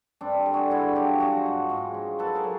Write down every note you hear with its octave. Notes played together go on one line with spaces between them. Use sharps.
G2 C4 D4
D3
F#4 G#4
G2 E4 F#4
F#3 F4 G4
F3 F#4 G#4
G#2
G#2
F3
F#3 A4 B4
G#4 A#4
F#3